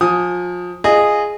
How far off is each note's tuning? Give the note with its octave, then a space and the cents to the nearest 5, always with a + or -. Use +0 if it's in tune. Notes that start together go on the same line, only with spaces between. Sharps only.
F3 +30 G#5 +0 D#6 +0
F4 -20 G#4 +0 D#5 -20